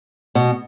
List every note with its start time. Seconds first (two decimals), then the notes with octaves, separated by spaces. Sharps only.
0.35 B2